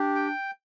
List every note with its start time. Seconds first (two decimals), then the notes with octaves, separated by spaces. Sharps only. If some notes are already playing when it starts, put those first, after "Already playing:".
Already playing: D4 G4
0.15 G5